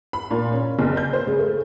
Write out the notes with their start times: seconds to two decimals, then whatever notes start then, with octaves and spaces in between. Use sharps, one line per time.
0.13 B5
0.31 A#2
0.52 C#4
0.79 F#1
0.97 G6
1.13 C5
1.27 C#3
1.39 A3